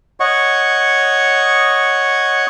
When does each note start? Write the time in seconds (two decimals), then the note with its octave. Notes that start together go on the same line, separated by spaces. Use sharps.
0.20 C#5 D#5 F#5 C#6